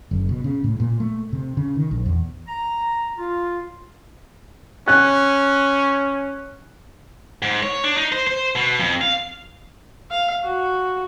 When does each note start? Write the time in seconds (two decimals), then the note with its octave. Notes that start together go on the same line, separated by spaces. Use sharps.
0.11 F#1
0.29 B2
0.44 C#3
0.64 A2
0.80 A#2
1.00 A3
1.33 C3
1.57 C#3
1.76 D#3
1.91 A#1
2.06 E2
2.48 A#5
3.18 F4
4.88 C#4 F#6
7.42 G#2
7.63 C#5
7.84 D4
7.97 D#4
8.12 C5
8.27 C5
8.55 B2
8.79 F2
9.01 F5
10.11 F5
10.43 F#4